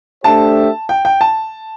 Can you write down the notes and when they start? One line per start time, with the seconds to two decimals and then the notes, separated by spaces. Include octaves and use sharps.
0.23 A3 D4 G4 C5 E5 A5
0.89 G5
1.05 G5
1.21 A5